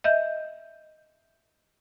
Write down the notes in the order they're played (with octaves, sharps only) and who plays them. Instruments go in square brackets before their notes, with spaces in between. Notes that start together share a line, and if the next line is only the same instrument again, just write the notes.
[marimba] D#5 E5 G6